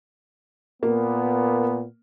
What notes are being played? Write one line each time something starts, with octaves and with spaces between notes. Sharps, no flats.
A#2 A#3 B3